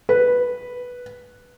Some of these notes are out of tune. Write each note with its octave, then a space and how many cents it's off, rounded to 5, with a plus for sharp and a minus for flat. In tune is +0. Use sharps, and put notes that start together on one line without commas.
B4 -5